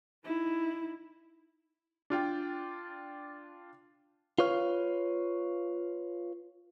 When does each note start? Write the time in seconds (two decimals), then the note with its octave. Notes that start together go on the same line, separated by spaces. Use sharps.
0.25 D#4 E4
2.10 D4 F4 G5
4.39 F4 B4 C#5 F5